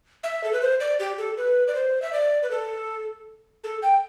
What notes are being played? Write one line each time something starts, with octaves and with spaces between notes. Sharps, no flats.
E5
A4
B4
C5
D5
G4
A4
B4
D5
C5
E5
D5
B4
A4
A4
G5